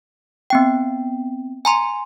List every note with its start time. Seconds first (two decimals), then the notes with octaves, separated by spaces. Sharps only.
0.50 B3 C4 G5
1.65 G#5 A#5 C6